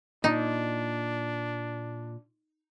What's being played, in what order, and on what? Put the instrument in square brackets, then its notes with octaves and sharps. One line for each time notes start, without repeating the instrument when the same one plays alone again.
[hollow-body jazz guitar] A#2 [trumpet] D4 [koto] D#4